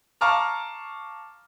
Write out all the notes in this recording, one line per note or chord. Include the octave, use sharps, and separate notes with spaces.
F5 A5 A#5 C#6 D6 F6